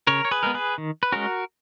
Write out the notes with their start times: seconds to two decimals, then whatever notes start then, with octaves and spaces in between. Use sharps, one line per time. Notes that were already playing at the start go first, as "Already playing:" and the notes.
0.07 C#3 A#4 C#5
0.25 C#5
0.31 G#4 B4
0.43 G#3 B3 A#4
0.54 G#4 B4
0.78 D#3
1.03 B4
1.12 G#3 C#4 F#4 A#4